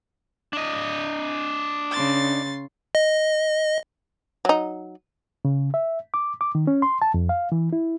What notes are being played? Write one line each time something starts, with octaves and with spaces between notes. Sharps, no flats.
D4 D#5
C#3 C6 A6
D#5
F#3 D#4
C#3
E5
D6
D6
D#3
C#4
C6
A5
F2
F5
E3
E4